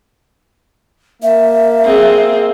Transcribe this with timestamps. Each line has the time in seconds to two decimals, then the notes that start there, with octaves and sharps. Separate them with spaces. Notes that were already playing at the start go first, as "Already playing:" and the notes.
1.22 A#3 E5
1.84 C4 G#4